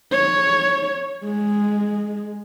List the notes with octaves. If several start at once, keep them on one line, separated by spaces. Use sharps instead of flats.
C#5
G#3